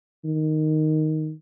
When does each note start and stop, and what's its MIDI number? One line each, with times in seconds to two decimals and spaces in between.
0.25 1.32 51